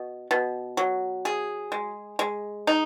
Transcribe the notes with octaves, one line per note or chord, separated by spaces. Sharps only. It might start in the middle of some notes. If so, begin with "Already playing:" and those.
Already playing: B2
B2
F#3
G#4
G#3
G#3
D#4